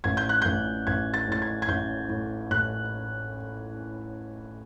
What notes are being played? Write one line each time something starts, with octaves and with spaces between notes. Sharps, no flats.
A1 G#6
G6
F#6
A1 G6
A1 G#6
A6
A2 A6
G#6
G#6
A1 G6
A2
A2 F#6